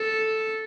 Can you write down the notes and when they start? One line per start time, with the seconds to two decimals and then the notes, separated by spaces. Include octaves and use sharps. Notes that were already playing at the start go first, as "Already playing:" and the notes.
Already playing: A4